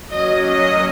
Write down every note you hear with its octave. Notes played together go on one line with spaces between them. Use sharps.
F#3 A#3 C#4 D#5
D#5